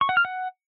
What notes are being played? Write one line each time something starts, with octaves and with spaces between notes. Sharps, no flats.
C#6
F#5
F6
F#5